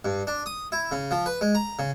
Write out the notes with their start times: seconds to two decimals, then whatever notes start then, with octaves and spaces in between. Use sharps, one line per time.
0.05 G2
0.27 D4
0.46 D#6
0.72 E4
0.91 C#3
1.11 F3
1.26 B4
1.41 G#3
1.55 A#5
1.79 C#3